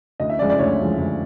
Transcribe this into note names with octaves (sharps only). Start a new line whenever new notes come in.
D2 D#5
E5
C#3 F3 G#3 D5
D5
D2 C#5
C#3 F3 G#3
D2